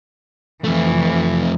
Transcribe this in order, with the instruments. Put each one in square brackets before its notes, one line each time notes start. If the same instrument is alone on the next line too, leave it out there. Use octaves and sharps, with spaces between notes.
[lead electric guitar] F2 A3 [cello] E3